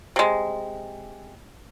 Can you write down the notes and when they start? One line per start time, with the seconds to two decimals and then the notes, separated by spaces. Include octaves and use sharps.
0.16 C3 G#3